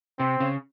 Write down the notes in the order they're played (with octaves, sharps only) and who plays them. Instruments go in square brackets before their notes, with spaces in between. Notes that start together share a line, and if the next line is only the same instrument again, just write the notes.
[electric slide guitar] C3 [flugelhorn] C4
[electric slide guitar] C#3